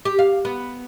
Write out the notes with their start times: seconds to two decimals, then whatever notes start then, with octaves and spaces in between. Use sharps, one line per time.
0.05 G4
0.19 F5
0.45 B3